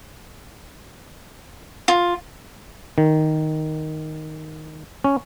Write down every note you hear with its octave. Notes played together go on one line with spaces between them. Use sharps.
F4
D#3
C#4